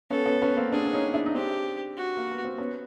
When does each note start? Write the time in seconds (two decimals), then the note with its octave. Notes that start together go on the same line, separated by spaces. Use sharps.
0.10 B3 C#4 A4
0.26 B3 C#4
0.42 B3 C#4
0.57 A#3 C4
0.72 C4 D4 G#4
0.86 D4
0.93 C#4 D#4
1.14 D4 E4
1.26 D#4
1.35 C4 D4 G4
1.97 F#4
2.17 A#3
2.31 B3
2.45 C4
2.58 B3 C#4